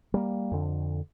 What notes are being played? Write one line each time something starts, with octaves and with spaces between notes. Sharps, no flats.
G3 A#3
F2 D3